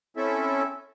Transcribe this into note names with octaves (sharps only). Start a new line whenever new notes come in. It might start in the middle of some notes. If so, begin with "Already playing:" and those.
C4 C#4 E4 A4 E5